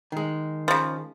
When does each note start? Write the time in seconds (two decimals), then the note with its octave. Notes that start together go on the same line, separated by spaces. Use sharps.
0.12 D#3 G#3
0.68 C#3 F3